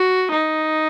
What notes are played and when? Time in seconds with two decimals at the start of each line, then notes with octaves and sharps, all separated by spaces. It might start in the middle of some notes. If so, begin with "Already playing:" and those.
Already playing: F#4
0.31 D#4